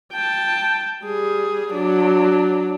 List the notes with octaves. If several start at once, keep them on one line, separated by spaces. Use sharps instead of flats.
G5 A5
G3 G#4
F#3 D4